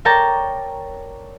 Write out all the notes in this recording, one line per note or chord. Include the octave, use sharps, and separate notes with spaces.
A#4 C#5 D5 G5 A5 A#5